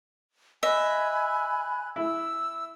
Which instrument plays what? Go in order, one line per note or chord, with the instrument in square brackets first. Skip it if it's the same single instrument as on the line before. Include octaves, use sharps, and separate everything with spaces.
[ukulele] D#5 [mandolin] E5 [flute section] G#5 B5 F#6
[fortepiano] E4 [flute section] E6